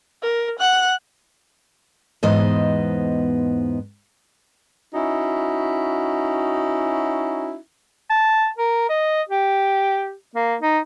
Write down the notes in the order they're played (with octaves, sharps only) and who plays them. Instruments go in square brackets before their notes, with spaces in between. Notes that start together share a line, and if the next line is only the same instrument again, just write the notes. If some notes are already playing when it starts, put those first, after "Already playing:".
[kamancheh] A#4
F#5 F#6
[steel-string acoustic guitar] E2 G#2 B3 C5 D#5
[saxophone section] C#4 D#4 E4 F#4
[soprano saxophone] A5
A#4
D#5
G4
A#3
D#4